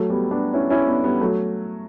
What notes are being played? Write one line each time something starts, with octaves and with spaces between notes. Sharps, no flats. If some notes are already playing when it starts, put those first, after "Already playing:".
Already playing: F#3 A3
G3 B3
B3 D4
C#4 E4
C#4 E4
B3 D4
G3 B3
F#3 A3